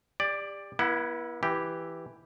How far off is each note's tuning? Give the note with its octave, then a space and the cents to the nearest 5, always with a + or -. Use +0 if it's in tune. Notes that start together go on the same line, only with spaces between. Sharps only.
G4 +35 D5 +5
B3 -40 E4 +10 F#5 +20
E3 +0 G4 +0